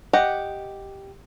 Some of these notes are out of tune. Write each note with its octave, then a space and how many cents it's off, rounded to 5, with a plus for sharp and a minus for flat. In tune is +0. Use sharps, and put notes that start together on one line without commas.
G4 +0 D#5 +0 F#5 +0